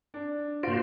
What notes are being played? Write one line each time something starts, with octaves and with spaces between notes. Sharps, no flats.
D4
A#2 F4 F#4 C5 D7